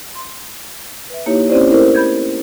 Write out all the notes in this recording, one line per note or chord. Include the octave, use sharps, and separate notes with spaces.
C6
B4 E5
A#3 D#4 E4 G4 C#5
C4 C#4 E4 G4 C5 D5
A3 C4 E4 A4 A#4 C5
B5 G6 G#6